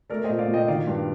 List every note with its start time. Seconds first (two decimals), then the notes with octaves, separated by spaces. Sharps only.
0.10 A3 A#4 D5
0.24 A#2 C5 D#5
0.38 D5 F5
0.48 A#2
0.54 D#5 G5
0.68 D#3 D5 F5
0.87 G2